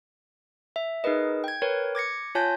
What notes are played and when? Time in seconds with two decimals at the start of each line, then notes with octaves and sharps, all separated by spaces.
0.76 E5
1.04 D#4 G#4 A#4 B4 D#5
1.44 G5 G#6
1.62 A#4 B4 C#5 G5
1.95 D6 G#6 A#6 C#7
2.35 F4 C#5 G#5 A5 G6 A#6